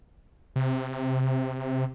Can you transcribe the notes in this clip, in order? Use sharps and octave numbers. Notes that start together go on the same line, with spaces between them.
C3